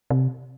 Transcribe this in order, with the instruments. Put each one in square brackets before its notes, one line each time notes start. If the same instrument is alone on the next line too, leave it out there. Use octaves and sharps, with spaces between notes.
[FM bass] C3